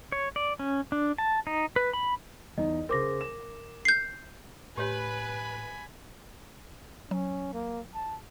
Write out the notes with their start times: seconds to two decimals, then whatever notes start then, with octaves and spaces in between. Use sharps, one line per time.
0.12 C#5
0.36 D5
0.59 C#4
0.92 D4
1.18 A5
1.47 D#4
1.76 B4
1.93 B5
2.58 E2 D#4 D#5
2.89 C#3 A#4 C5 D6 A#6
3.21 E7
3.85 G6 C7
4.78 A2 G4 B4 C#5 G#5 B5
7.11 F#3 C#4
7.53 A#3
7.95 A5